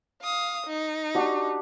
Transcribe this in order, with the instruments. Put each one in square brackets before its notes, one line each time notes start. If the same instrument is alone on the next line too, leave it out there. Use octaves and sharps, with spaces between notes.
[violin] F5 D#6
D#4
[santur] D4 F#4 G4